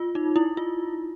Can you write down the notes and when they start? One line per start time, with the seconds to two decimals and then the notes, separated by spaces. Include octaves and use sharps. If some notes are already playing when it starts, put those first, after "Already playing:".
Already playing: F4
0.15 D#4
0.36 E4
0.57 F4